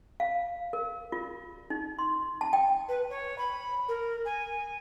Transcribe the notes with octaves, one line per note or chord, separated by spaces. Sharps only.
F5
A#4
F4
D#4
C6
A5
G5
B4
C#5
B5
A#4
G#5